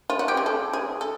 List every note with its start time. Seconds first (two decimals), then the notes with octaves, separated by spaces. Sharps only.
0.10 F4
0.19 F#4
0.28 G4
0.37 G#4
0.46 A4
0.73 G#4
1.01 A4